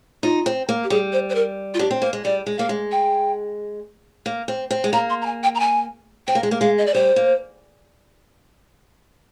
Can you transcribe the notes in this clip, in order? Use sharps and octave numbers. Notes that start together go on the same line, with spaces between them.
D#4 F4
C4
A#3
G4
G3 G#4
C5
C5
A#4
F4
D4 G4
C4
A#3 C5
G#3
G3 D5
G#3
A#3 F5
G#3
G5
A#3
C4
C4
G#3
A#3 A#5
C6
A#5
G#5
G5
A#5
G#5
C4 G5
A#3
G#3
A#3
G#3 F5
D#5
D5
G3 C5
A#3